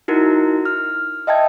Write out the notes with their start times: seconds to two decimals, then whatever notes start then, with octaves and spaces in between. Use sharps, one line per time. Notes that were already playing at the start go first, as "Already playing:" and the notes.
0.08 D#4 E4 F#4 A#4
0.65 F6
1.27 D#5 E5 G5 A5 G#6